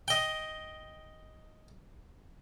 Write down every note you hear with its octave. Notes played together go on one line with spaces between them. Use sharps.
D#5 G5